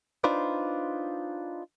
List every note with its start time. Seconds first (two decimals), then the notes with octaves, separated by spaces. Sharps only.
0.24 D4 D#4 F4 B4 C5 D5